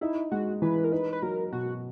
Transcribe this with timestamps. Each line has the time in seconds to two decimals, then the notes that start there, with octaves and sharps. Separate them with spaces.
0.01 D#4 E4
0.31 G#3 F#4
0.62 E3 B4
0.84 A#4
0.92 D#4 B4
1.13 B4
1.22 F#3 A#4
1.52 B2 F#4